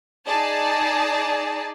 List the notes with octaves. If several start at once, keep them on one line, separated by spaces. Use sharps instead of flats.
D#4 G#4 D5 A5